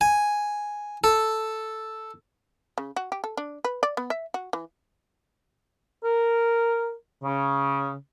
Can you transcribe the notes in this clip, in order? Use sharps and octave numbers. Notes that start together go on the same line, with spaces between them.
G#5
A4
C#3
F#4
G4
A4
D4
B4
D5
B3
E5
F#4
E3
A#4
C#3